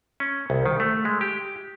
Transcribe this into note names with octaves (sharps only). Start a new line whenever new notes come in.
C#4
C2
D#3
A3
G#3
G4